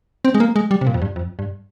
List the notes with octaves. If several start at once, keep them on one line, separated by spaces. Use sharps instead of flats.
C4
G#3
A#3
G#3
G3
C3
A#2
F2
G2
F2
G2